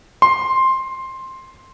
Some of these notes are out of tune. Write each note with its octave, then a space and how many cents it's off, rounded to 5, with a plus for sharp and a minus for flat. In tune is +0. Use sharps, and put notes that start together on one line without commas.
C6 +10